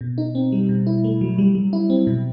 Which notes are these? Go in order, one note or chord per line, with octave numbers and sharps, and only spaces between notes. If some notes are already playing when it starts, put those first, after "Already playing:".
B2
D#4
C4
G3
B2
E4
A3
F#3
G3
G3
E4
C4
B2